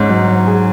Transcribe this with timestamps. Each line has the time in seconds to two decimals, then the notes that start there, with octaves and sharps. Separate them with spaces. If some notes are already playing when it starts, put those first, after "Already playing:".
Already playing: G#2 C#4
0.09 F#3
0.28 F#3
0.46 G#4